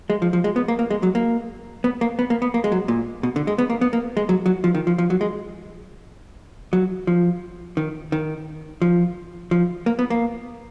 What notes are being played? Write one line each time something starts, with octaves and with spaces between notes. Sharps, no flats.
G#3
F3
F3
G#3
B3
A#3
A#3
G#3
F#3
A#3
B3
A#3
B3
A#3
B3
A#3
G#3
F#3
A#2
B2
D3
G#3
B3
A#3
B3
A#3
G#3
F#3
F#3
F3
D#3
F3
F3
F#3
G#3
F#3
F3
D#3
D#3
F3
F3
A#3
B3
A#3